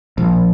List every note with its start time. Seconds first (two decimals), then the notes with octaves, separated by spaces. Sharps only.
0.18 A#1